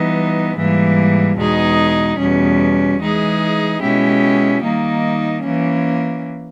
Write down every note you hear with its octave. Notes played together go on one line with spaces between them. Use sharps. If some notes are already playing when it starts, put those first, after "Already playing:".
Already playing: E3 G3 B3 D#4
G#2 E3 G3 A#3
E2 B2 G#3 D#4 G#4
E2 B2 G3 C#4
E3 G#3 D#4 G#4
B2 G#3 C#4 E4 G4
D#3 G3 A#3 D#4
E3 A#3 C#4